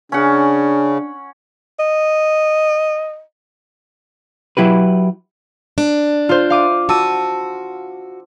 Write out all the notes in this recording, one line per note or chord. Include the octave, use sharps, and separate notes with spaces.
C#3 C#4 D4 F#5
D#5
F#3 E4 G4 B4
D4
F4 C5
F5 D6 D#7
F#4 A5 E6 D#7